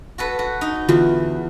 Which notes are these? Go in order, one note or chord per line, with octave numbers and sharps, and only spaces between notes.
F#4 A4 B4
F#4
D#4
E2 D3 F4 F#4